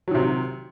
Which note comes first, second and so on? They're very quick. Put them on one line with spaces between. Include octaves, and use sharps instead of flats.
F#3 D#3 C3